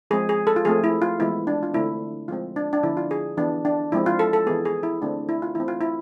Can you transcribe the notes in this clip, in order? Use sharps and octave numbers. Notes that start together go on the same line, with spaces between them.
F3 G#3 C4 G#4
G#4
A4
F4
F3 A3 C4 G#4
E4
F4
E3 G#3 B3 E4
D4
F4
D3 A3 C4 E4
F3 G#3 C4 F4
D4
D4
D3 F3 B3 E4
F4
G#4
E3 B3 D4
D4
F3 G#3 C4 E4
F4
A4
A4
E3 B3 G#4
G#4
E4
D3 A3 C4 D4
E4
F4
E3 A3 C4 E4
F4
E4